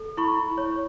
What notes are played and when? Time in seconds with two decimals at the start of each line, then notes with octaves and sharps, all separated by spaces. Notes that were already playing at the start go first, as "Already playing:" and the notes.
Already playing: A4
0.17 E4 B5 C#6
0.58 C#5